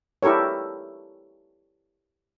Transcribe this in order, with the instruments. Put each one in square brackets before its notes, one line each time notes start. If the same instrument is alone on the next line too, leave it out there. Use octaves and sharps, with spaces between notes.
[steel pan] E4 G4 A4 A#4 C#5